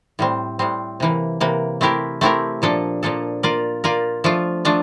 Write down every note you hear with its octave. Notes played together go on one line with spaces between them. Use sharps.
A2 G3 C4
A2 G3 C4
C3 E3 A#3
C3 E3 A#3
A3 C4 E4 G4 A#4
A3 C4 E4 G4 A#4
A#2 F3 A#3 D4 A4
A#2 F3 A#3 D4 A4
A#3 F4 A#4 D5
A#3 F4 A#4 D5
F3 A3 D4 F4
F3 A3 D4 F4